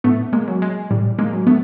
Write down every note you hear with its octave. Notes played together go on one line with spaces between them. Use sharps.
A2 A3 B3
G#3 A#3
F#3
G#3
A2 G3
G#3 A#3
F#3
A3 B3